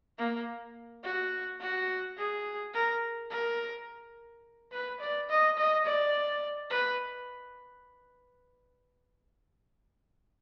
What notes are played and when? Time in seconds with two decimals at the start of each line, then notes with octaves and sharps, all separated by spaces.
0.18 A#3
1.04 F#4
1.60 F#4
2.18 G#4
2.74 A#4
3.30 A#4
4.72 B4
5.00 D5
5.29 D#5
5.57 D#5
5.85 D5
6.70 B4